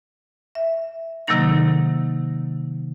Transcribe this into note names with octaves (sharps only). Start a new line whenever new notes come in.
E5
C3 D#3 F#3 A#3 D#4 A#6